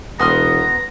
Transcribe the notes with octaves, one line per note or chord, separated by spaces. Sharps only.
E1 B3 A#5 C6 F6